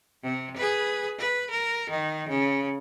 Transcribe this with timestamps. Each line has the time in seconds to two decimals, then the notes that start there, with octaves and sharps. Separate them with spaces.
0.23 C3
0.57 G#4 B4
1.19 B4
1.51 A#4
1.90 D#3
2.29 C#3